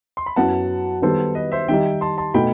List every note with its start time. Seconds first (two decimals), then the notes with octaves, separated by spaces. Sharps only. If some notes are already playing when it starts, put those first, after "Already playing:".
0.17 C6
0.26 B5
0.36 F#2 F#3 B3 E4 F#5 A5
1.02 D#3 G3 B3 A4 C5
1.35 B4 D#5
1.52 C5 E5
1.68 D#3 G3 D#4 E5 G5
2.01 A5 C6
2.18 A5 C6
2.34 B2 A3 D#4 G5 B5